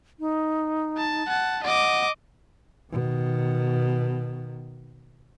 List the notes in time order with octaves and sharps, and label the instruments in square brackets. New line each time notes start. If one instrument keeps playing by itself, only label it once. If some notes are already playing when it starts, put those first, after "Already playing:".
[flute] D#4
[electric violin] A5
F#5 A5
[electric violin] D#5 D6 [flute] F#5
[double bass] B2 D#3